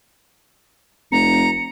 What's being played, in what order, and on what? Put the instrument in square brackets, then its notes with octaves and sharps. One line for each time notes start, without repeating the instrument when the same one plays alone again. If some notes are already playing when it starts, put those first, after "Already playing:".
[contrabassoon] F1 [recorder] A#5 [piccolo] C#7